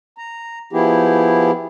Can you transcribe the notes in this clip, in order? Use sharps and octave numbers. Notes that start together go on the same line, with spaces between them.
A#5
F3 B3 E4 G4 G#4